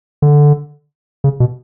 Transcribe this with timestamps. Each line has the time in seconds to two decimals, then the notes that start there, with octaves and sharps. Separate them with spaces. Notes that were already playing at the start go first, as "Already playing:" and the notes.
0.22 D3
1.24 C#3
1.40 B2